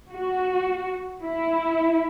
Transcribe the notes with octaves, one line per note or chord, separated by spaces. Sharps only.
F#4
E4